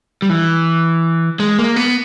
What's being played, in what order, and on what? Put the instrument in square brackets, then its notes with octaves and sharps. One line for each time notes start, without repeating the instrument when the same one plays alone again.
[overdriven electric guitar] G3
E3
G#3
A#3
B3